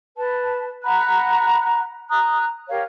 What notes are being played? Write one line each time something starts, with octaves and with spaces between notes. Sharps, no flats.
B4 A5
F#5 A#5 B5 F#6
A#5 D#6 F#6
G4 A#4 C#5 F5